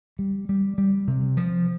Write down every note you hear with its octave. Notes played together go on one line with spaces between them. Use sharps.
G3
G3
G3
C3
F3